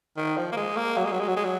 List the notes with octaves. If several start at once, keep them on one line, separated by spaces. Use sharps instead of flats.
D#3
F3
A#3
G#3
A#3
F#3
G#3
F#3
G#3
F#3
G#3
F#3